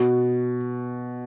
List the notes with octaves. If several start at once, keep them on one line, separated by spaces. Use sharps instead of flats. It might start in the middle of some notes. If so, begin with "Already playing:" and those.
Already playing: B2